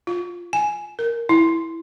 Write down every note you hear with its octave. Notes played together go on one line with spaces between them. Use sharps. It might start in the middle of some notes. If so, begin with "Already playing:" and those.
F4
G#5
A#4
E4